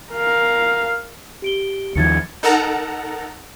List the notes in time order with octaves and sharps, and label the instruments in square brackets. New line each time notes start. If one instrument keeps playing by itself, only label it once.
[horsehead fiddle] A#4 F5
[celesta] G4 D7 G7
[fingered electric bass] D#2 D#3 F3 [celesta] G#6 A6 C#7
[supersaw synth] D#4 A4 A#4 F#5 A5 A#5